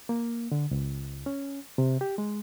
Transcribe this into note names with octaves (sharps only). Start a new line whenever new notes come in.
A#3
D3
C#2
C#4
C3
G4
G#3